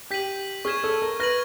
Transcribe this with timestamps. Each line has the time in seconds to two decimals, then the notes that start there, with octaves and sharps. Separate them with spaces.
0.10 G4 G6 B6 D#7 F#7
0.65 G#4 C#6 F6 G#6 B6 E7
0.84 A4
1.02 A#4
1.20 B4 F6 A#6 D#7 F#7